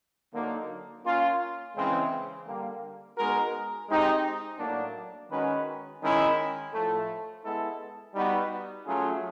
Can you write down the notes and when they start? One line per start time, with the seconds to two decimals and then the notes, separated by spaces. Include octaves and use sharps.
0.32 D3 F#3 A#3 D#4 F#4
1.04 A#3 C#4 F4
1.75 C#3 E3 G#3 C4
2.45 D3 G3 A#3
3.16 G#3 B3 D#4 F#4 A#4
3.88 G#3 C4 D#4 G4
4.58 A2 F#3 A#3 D4
5.30 D#3 G#3 C#4 F#4 B4
6.01 D#3 G#3 C#4 E4
6.73 A2 F3 A3
7.43 G#3 B3 E4 A4
8.14 G3 B3 D#4 F#4 B4
8.86 F#3 A3 C#4 F4 G#4